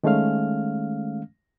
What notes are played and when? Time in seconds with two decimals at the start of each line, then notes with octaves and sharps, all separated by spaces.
0.04 D#3 G#3 A3 C#4 F5 F6